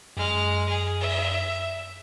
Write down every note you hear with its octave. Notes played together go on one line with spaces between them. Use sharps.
F#2 G#3 F6
G#4
E5